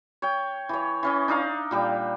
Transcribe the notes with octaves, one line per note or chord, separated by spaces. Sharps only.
C#5 G5
E3 C#5
E3 C#4 D#5
D4 D#4 F5 A#5
A#2 G3 G5